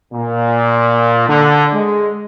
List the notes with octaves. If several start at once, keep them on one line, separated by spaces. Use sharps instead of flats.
A#2
D3
G#3